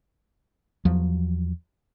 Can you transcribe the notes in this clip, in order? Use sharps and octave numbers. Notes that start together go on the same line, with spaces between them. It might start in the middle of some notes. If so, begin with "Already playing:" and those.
E2 F3 F#3